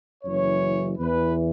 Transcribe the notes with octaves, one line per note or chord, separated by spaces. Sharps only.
F#1 F#2 E3 C#5
E2 E3 B4